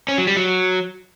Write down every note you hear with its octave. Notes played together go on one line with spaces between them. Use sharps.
C#4
F#3
G3
F#3